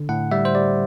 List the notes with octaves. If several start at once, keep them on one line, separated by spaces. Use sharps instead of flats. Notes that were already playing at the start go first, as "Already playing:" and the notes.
Already playing: D3
A2 F#5
G3 E5
C5
G3 D5